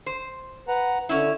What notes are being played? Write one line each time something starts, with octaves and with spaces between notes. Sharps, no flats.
C5
B4 F#5 A#5
D3 C#4 E4